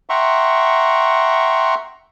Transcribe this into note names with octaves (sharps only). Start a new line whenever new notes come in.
E5 F#5 G5 A#5 C6 C#6